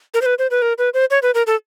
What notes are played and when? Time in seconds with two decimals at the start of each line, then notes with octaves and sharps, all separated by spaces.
0.14 A#4
0.22 C5
0.26 B4
0.39 C5
0.51 B4
0.62 A#4
0.78 B4
0.94 C5
1.11 C#5
1.23 B4
1.34 A#4
1.47 A4